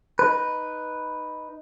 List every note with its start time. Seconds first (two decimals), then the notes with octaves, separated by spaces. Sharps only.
0.19 D#4 B4